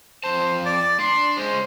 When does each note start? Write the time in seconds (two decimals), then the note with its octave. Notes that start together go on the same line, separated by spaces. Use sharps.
0.24 F2 C5 A5
0.65 D5
1.00 D4 C6
1.37 G#3 C#4 C5